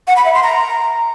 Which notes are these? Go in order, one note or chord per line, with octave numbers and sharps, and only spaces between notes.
F#5
B5
E5
C6
A#5